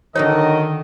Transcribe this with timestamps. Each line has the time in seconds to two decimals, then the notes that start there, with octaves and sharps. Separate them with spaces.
0.15 D3 D#3 F#3 F#4 A4 A#4 C#5 D#5